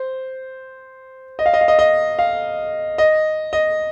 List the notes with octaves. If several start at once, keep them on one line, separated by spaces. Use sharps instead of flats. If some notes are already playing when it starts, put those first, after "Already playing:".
Already playing: C5
D#5
F5
D#5
F5
D#5
D#5
F5
D#5
D#5